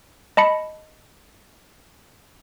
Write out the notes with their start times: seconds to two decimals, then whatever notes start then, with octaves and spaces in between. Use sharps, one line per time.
0.37 D#5 A5 B5 C#7